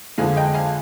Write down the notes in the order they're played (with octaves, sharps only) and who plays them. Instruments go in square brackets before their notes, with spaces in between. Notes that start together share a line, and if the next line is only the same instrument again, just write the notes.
[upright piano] F2 D3 G#3 F5 G#5
D#5 G5
F5 G#5